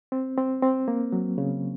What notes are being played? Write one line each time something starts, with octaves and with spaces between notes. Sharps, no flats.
C4
C4
C4
A#3
F#3
C#3